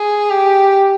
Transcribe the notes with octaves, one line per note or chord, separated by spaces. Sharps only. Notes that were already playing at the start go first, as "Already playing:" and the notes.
Already playing: G#4
G4